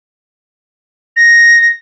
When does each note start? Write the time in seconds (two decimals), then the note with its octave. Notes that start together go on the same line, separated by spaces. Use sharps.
1.17 A#6